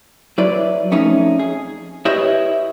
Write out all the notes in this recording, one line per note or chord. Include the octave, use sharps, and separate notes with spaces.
F#3 E4 B4 D5
F2 A3 C#4 D#4
G#4
E4 G4 B4 C#5 D#5 E5